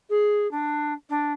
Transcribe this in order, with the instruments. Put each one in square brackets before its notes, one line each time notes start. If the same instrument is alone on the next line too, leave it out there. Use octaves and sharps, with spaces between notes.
[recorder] G#4
D4
D4